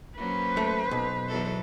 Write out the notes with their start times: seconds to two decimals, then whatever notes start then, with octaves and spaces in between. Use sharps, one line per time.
0.17 F#3 A#3 C#4 B4 C5
0.57 A3
0.91 B1 B2
1.28 E2 F#3 A4